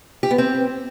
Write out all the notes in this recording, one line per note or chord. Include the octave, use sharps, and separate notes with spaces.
G4
B3
C4